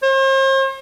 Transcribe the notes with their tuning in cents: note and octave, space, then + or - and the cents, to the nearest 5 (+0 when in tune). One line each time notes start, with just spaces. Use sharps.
C5 +45